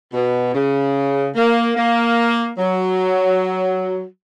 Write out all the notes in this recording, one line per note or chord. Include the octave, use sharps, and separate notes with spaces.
B2
C#3
A#3
A#3
F#3